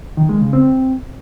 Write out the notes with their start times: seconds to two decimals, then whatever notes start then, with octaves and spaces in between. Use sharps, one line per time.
0.17 D#3
0.29 G#3
0.41 C#3
0.53 C4